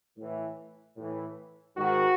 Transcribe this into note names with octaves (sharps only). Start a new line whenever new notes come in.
A2 E3
A2 E3
G#2 D#3 F#4